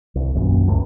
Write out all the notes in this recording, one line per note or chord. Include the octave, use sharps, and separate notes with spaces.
C2
D#1 A#1 F#2
E1 C#2 A2